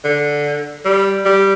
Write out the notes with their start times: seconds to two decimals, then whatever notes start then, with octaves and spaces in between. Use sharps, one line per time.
0.04 D3
0.85 G3
1.26 G3